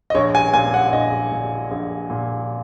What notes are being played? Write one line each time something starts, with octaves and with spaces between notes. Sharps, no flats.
D#5
A#1 C#5
G#5
A#2 G#5
F#5
A#1 D#5
A#2
A#1
A#2